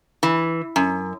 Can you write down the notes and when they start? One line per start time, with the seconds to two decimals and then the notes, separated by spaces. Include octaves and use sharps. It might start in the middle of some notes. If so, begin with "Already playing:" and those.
0.23 E3
0.76 F#2